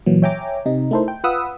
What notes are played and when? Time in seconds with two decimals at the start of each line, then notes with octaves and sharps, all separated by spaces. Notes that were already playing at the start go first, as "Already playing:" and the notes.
0.06 A#2 E3 F#3
0.22 C#5 E5 G5 G#5 A#5 D6
0.66 C3 D#4
0.91 A3 D#4 E4 A4 A#4 C5
1.08 G5
1.24 F4 B4 F#5 B5 D#6 E6